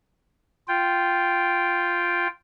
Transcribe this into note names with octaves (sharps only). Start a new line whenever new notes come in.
F4 G5